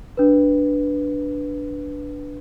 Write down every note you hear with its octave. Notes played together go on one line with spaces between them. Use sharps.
D4 B4